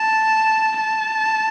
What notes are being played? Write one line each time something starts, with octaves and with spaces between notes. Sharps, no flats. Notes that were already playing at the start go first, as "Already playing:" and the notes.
Already playing: A5
A5